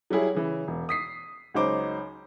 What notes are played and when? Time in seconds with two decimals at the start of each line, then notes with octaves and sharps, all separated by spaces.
0.10 F#3 G3 E4 G#4
0.34 C#3 E3
0.67 E1
0.89 D#6 B6 C7
1.54 C#2 F#3 D#4 C5 D6